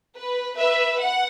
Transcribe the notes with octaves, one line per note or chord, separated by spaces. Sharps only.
B4
B4 E5
F#5